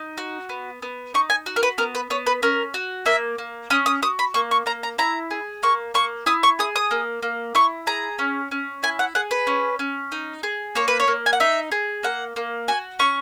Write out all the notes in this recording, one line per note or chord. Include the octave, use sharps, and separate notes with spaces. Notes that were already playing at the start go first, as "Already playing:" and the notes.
Already playing: D#4
F#4
B3
B3
D#4 C#6
G#5
F#4
A#4
B4
B3 A#4
B4
B3 C#5
B4
C#4 A#4
F#4
A#3 E5
A#3
C#4 D#6
D#6
F#4 D#6
B5
A#3 C#6
C#6
A#3 A#5
A#5
E4 A#5
G#4
A#3 C#6
A#3 C#6
E4 D#6
C#6
G#4 D#6
D#6
A#3
A#3
E4 C#6
G#4 A#5
C#4
C#4
E4 G#5
F#5
G#4 F#5
B4
C#4
C#4
D#4
G#4
A#3 C#5
B4
C#5
A#3
G#5
F#5
D#4 E5
G#4
A#3 F#5
A#3
F#4 G#5
C#4 C#6